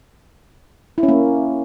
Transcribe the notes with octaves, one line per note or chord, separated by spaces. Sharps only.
E4
C#4
A#3